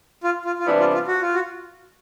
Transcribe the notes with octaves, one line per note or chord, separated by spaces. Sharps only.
F4
F4
F4
C3 E3 G3 B3 D4 E4
F4
F4
F#4
F4
F#4